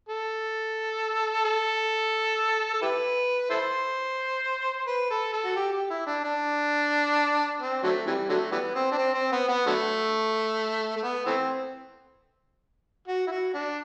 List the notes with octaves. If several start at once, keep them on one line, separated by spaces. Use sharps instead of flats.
A4
A4
A4
E4 G4 B4
E4 A4 C5
B4
A4
A4
F#4
G4
G4
E4
D4
D4
C4
D3 F#3 A3
C3 E3 G3
D3 F#3 A3
E3 G3 B3
C4
D4
C4
C4
B3
B3
D3 F#3 A3
A3
B3
E3 A3 C4
F#4
E4
F#4
D4